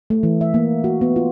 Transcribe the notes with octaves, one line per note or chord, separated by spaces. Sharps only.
A3
E3
E5
A#3
F#4
B3
F4